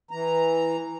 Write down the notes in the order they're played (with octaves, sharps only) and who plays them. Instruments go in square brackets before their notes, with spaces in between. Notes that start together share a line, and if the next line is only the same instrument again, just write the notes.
[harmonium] E3 A#5